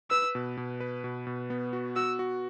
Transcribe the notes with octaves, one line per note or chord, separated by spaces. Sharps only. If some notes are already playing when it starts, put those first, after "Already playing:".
B4 E6
B2
B2
B4
B2
B2
B3
F#4
F#4 E6
F#4